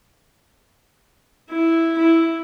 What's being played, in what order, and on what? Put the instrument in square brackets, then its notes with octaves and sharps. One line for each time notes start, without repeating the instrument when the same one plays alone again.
[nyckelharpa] E4
E4